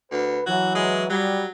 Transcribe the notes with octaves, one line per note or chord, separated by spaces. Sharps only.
D2 B4
E3 F#3 F#4
G#3
F#3 G3